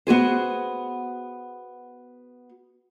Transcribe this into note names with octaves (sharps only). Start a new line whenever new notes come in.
B3 F#4 G#4 C5